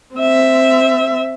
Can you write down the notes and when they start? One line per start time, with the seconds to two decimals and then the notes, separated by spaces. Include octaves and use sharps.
0.16 C4 E5